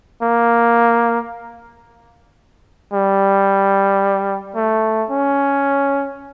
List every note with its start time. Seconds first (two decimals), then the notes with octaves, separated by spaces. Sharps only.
0.22 A#3
2.93 G3
4.56 A3
5.10 C#4